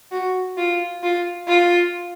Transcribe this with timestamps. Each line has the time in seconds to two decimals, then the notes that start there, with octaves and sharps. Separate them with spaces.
0.11 F#4
0.57 F4
1.03 F4
1.48 F4